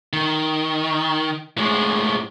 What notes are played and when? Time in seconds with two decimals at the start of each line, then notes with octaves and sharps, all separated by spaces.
0.13 D#3
1.58 A2 G#3